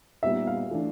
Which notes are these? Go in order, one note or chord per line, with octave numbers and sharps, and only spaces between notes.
A#2 G3 B3 D#4 E5
F5
E3 A3 D4